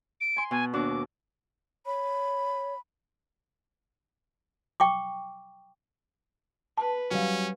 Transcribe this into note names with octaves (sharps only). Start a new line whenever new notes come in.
D7
G#5 C6
B2 G#5
D#2 D4 F#4 D6
C#5 B5
G5 C#6 D6
B4 A5
F#3 G3 C#4 F5